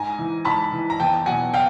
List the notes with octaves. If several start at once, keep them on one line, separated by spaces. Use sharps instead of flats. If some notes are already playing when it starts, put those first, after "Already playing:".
Already playing: G#2 G#5 A#5
E3
G#2 A5 B5
E3
A#5
E2 G5 A5
B2 F#3 F#5 G#5
F5 G5